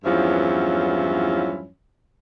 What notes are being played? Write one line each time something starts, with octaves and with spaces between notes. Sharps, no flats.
E2 G2 F3 F#3 C#4 E4